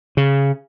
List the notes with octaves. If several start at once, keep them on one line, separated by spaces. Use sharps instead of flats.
C#3